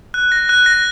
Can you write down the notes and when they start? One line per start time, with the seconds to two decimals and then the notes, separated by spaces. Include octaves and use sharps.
0.14 F#6
0.32 A#6
0.49 F#6
0.66 A#6